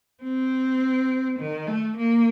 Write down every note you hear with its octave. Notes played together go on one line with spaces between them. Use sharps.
C4
D#3
A3
A#3